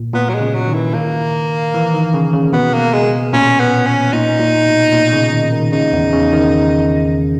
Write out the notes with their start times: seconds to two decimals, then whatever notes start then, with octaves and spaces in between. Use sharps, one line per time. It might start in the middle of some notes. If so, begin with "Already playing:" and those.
Already playing: A#2
0.14 A#2 B3
0.29 F#3
0.34 G#3
0.40 C#3
0.54 F#3
0.68 D#3
0.74 E3
0.94 A#3
1.74 E3
1.94 D#3
2.14 C#3
2.33 C#3
2.53 B2 B3
2.73 A#3
2.93 G#3
3.33 A#2 C#4
3.60 B3
3.86 C#4
4.13 A#2 D#4
4.39 A#2
4.66 B2
4.92 A#2
5.13 C#3
5.33 D#3
5.53 D#3
5.72 C#3 D#4
5.93 E2
6.12 C#3
6.33 D#3